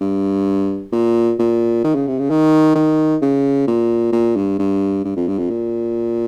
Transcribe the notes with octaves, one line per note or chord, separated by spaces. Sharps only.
G2
A#2
A#2
D#3
C#3
C3
C#3
D#3
D#3
C#3
A#2
A#2
G2
G2
G2
F2
G2
F2
A#2